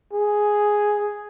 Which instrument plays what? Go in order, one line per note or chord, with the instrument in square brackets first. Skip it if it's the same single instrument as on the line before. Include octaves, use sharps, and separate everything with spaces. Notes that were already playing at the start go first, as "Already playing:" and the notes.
[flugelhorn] G#4